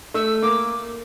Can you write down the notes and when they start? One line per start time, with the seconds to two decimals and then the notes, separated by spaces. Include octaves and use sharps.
0.14 A3 E6
0.42 A#3 D6